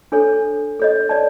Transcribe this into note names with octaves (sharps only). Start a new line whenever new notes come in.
D4 A4 C#5
A4 C#5 D#5
C#5 D5 A5